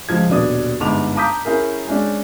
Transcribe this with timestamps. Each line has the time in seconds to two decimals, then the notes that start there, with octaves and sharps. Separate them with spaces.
0.09 C#2 F3 G#6
0.29 D#1 B2 D4 D#6
0.80 G1 G#2 D#4 A5 D6 F7
1.16 A5 A#5 D6 D#6 G6 B6
1.45 C#4 E4 G#4 A#4
1.88 G#3 C#4 D4